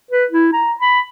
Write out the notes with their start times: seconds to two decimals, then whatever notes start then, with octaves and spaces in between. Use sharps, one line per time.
0.11 B4
0.30 E4
0.53 A#5
0.80 B5